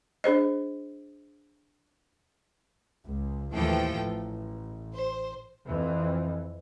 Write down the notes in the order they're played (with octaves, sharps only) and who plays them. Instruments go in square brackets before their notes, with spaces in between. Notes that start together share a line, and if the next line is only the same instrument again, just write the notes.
[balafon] D4 G#4 C5 D#5
[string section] C#2
D#2 A2 E3 F3 A4 G5
A1
C5
[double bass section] F2 E3